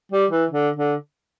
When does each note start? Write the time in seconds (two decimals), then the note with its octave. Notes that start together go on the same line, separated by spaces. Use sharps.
0.12 G3
0.31 E3
0.51 D3
0.76 D3